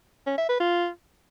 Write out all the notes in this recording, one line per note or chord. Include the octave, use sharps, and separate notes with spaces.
C#4
E5
B4
F4